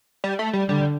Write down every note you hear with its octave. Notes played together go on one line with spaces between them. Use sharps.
G3
A3
G3
D3 G3